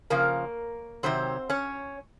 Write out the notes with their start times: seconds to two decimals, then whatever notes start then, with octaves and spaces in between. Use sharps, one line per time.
0.10 C#3 F3 A#3 A#4
1.03 C3 D#3 F#3 C4 C5
1.50 C#4 C#5